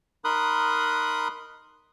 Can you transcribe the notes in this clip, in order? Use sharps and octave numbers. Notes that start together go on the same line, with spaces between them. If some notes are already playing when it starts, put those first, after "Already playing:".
D#4 A#4 B5 C6 D#6 F#6